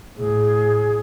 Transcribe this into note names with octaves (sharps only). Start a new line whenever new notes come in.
A2 G#4